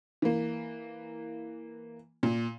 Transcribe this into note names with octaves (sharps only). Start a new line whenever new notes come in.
E3 A#3
A#2